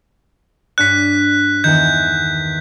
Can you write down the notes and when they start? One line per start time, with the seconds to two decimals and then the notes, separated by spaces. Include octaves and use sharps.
0.78 G2 D4 C#5 F#6 B6
1.64 E2 D#3 G6